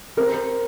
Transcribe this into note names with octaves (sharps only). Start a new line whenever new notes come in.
C4 A#4